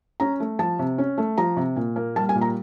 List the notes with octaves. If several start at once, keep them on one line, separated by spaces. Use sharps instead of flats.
C#4 A#5
A3
F3 A5
C3
C#4
A3
F3 A#5
C3
A#2
A#3
G3 A5
G#5
A#2
A#5